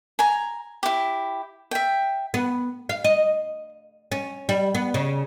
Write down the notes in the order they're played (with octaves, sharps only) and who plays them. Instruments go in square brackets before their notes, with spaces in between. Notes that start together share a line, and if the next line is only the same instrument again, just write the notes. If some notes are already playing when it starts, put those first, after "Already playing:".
[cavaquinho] G#5 A#5
E4 G4
E5 G5
[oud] B3
F5
D#5
C#4
G3
B3
C#3